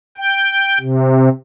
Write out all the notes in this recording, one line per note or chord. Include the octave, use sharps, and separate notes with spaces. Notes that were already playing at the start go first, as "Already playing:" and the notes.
G5
C3